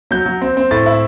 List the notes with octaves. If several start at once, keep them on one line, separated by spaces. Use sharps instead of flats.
F#3 G6
F#3
C4
C4
A2 A6
E4